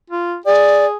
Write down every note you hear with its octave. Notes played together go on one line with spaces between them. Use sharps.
F4
G#4 D5